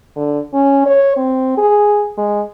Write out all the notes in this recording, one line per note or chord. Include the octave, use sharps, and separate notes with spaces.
D3
C#4
C#5
C4
G#4
G#3